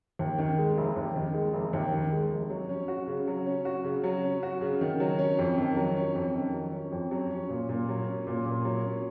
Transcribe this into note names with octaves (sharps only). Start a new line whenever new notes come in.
D#2
D#3
G#3
F1
D#2
D#3
G#3
F1
D#2
D#3
G#3
F1
F#3
C#4
F#4
C#3
F#3
C#4
F#4
C#3
F#3
C#4
F#4
C#3
D#3
F#3
C#4
F2
D#3
F#3
C#4
F2
D#3
F#3
C#4
F2
F#3
C#4
A#2
A#2
F#3
C#4
A#2
A#2
F#3
C#4